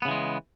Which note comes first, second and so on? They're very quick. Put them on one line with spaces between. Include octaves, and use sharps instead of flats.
B3 C#3 E3 G#3